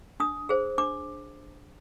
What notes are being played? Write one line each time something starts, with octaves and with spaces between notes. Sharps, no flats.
D4 D#6
G#4 C5
D4 D6